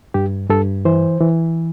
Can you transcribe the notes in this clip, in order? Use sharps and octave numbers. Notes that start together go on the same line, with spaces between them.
G2 G4
G2 A4
E3 C5
E3